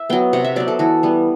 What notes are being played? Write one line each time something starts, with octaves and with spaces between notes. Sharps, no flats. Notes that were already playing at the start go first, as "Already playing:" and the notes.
Already playing: E5
F#3 B3 G5
C3 F#5
E5
F#3 B3 D5
A4
E3 F#4
G3 B3